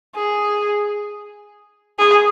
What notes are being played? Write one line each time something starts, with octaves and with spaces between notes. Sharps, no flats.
G#4
G#4